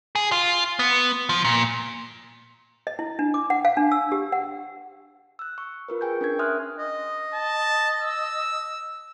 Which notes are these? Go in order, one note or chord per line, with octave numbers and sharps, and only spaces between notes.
G#4
F4
B3
F3
A#2
D#5
E4
D4
D6
F#5
F5
D4
E6
G4
F#5
E6 F#6
C#6
F4 A#4 B4
G#4 G5 G#5 C#6 G6
C#4 D4 A#4 G#6
E5 G#5 C6 D#6 F6 F#6
D#5
A5
E6